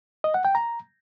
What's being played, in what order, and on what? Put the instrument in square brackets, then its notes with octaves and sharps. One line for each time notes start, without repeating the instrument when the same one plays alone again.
[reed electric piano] D#5
F#5
G5
A#5